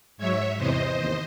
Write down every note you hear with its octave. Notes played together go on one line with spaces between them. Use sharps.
G#2 F#3 C#5 E5
E2 C3 E3 C5 D#5
D#2